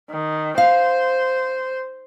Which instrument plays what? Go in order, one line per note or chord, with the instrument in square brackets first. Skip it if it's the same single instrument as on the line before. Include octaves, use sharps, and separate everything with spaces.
[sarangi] D#3
[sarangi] C5 [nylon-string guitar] F5